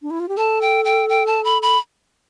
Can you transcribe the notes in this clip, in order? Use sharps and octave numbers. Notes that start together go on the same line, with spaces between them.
D4
E4
F4
G4
A4 A5
G5
G5
G5
A5
B5
B5